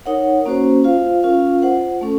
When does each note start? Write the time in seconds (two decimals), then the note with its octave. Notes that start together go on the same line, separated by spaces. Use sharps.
0.06 D#4 A#4 C#5 F#5
0.45 A#3 C#4 F#4 C5
0.84 F4 C5 F5
1.23 C#4 F4 A#4 F5
1.62 F4 C5 F#5
2.01 A3 C#4 A4